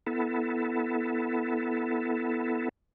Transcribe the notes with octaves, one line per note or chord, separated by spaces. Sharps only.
B3 E4 A4